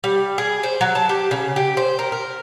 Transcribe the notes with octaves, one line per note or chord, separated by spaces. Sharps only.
G3
G#4
C5
F#3
A5
G4
C#3
G4
C5
A#4
A#4